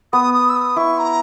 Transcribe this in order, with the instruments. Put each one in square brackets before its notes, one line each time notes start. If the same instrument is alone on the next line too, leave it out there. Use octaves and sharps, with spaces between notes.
[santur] B3 [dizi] D#6
[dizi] D#6
E6
D#6
[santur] E4 [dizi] C#6
[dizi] A#5